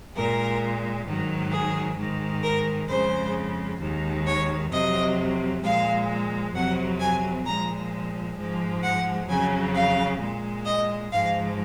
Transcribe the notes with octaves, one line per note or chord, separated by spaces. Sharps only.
A#2 G#3 A#4
G#2 D#3 F#3
G#4
G#2 D#3 G#3
A#4
F2 C#3 G#3 C5
D#2 D#3 G#3
C#5
F2 C3 F#3 D#5
A#2 F3 G#3 F5
F2 C3 F#3 F#5
G#5
A#2 F3 G#3 A#5
G#2 F3 G#3
F#5
F2 C#3 F#3 G#5
F5
A#2 G#3
D#5
G#2 F3 G#3 F5